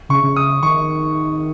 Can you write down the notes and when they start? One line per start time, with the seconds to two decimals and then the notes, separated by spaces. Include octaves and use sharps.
0.09 C#3 C#6
0.23 C#3
0.36 D#6
0.62 D#3 C#6